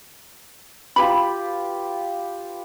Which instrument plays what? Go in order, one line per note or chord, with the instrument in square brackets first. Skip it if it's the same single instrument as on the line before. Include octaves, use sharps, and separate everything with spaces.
[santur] F4 G4 B4 [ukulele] B5